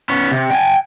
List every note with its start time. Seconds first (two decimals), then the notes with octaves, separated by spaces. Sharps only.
0.09 B3 C#4
0.32 C3
0.51 G5 G#5